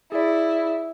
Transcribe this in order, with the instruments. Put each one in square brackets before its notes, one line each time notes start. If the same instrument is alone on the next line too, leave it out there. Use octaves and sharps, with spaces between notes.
[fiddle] E4 [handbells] G#4 D5